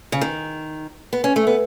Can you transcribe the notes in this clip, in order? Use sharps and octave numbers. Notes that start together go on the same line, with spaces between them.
C#3
D#3
B3
C#4
A3
B3